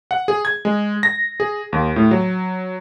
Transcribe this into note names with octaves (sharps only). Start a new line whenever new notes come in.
F#5
G#4
G#6
G#3
A#6
G#4
D#2
A2
F#3